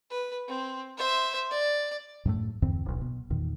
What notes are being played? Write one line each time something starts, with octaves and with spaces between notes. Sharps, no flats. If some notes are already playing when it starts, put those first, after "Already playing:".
B4
C4
C5 E5
D5
F#2 A2 A3
E2 G2 D3 C4
D1 B1
B2
E2 A#2 D#3